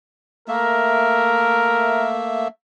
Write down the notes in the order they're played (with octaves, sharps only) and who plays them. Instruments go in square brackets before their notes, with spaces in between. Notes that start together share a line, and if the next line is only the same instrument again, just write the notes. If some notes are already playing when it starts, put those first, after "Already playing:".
[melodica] A3 A#3 E5 [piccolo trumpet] A#4